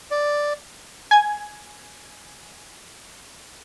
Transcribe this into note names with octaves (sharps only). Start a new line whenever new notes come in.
D5
G#5 G#6